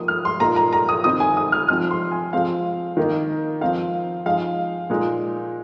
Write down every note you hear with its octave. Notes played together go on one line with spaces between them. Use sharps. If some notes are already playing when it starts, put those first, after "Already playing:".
Already playing: F3 A#3 D#4 D#6
F6
C6
A#2 A#3 D#4 A#5
A#5
A#5
D#6
D#3 C4 D#4 D#6
G#5
D#6
F6
F3 C4 D#4 F6
C6
G#5
F3 G#3 C4 F5
D#3 A#3 D#4
F3 C4 D#4 F5
F3 G#3 D#4 F5
A#2 G#3 D#4